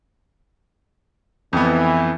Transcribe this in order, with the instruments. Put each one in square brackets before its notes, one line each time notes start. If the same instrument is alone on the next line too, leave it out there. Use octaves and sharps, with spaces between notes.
[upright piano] F2 B3 [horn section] E3